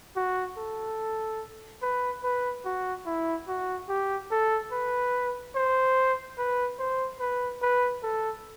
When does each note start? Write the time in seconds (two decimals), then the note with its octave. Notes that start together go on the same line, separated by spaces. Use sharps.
0.16 F#4
0.58 A4
1.82 B4
2.24 B4
2.65 F#4
3.06 E4
3.48 F#4
3.89 G4
4.31 A4
4.72 B4
5.55 C5
6.38 B4
6.79 C5
7.20 B4
7.62 B4
8.03 A4